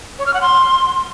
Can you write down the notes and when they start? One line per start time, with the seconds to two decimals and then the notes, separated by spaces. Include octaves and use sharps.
0.19 C#5
0.26 F6
0.34 F#5
0.41 C6